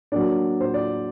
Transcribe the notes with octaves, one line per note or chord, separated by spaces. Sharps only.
F#3 A#3 D4 D5
C5
D5